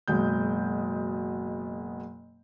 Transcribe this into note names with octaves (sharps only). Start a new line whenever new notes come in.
F#1 B2 G#3 G6